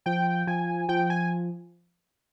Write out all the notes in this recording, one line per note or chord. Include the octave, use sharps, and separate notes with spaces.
F3 G5
F3 G#5
F3 G5
G#5